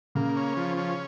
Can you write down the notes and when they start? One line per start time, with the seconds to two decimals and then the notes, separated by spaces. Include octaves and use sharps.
0.15 C#3 A#3
0.36 C#4
0.57 F3
0.77 C#4